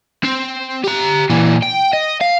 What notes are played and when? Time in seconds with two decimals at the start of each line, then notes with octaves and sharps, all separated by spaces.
0.25 C4
0.84 G4 A#5
1.30 A#2 E3
1.62 G5
1.93 D#5
2.21 F5